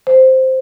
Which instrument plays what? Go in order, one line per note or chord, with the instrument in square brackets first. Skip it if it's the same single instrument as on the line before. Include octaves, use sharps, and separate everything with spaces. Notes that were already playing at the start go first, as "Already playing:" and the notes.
[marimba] C5